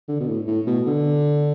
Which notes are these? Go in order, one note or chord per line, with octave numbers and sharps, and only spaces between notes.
D3
B2
A2
A2
B2
D3